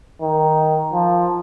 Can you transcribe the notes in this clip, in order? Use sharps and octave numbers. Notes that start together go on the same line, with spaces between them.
D#3
F3